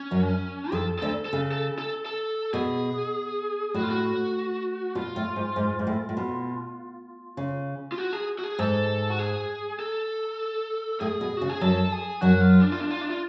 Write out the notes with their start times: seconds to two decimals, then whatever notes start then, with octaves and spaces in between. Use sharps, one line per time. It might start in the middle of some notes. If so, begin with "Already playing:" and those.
Already playing: C#4
0.11 F#2 F#3
0.72 F2 F3 A4
0.99 D2 D3 A4
1.25 A4
1.33 C#3
1.52 A4
1.78 A4
2.06 A4
2.53 B2 G#4
3.74 A2 F#4
3.83 F4
3.90 F#4
4.95 B2 F4
5.16 A2
5.36 G#2
5.56 G#2
5.79 G#2
5.87 A2
6.09 A2
6.17 B2
7.37 C#3
7.92 F4
7.98 F#4
8.13 G#4
8.39 F#4
8.44 G#4
8.59 G#2 A4
9.10 F#4
9.19 G#4
9.80 A4
11.00 A2 G#4
11.21 B2
11.37 C#3 F#4
11.49 G#4
11.61 F#2 F#3 A4
11.92 G#4
12.21 F#2 F#3 F#4
12.41 F4
12.62 D4
12.72 F4
12.81 D4
12.91 F4
13.02 D4
13.10 F4